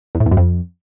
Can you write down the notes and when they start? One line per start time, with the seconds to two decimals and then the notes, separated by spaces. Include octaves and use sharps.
0.15 E2
0.20 A2
0.26 E2
0.31 F#2
0.37 F2